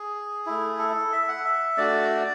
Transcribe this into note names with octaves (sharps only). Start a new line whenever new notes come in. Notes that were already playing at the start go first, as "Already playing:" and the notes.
Already playing: G#4
A3 E4
A4
E5
F#5
E5
A3 D4 F#4 D5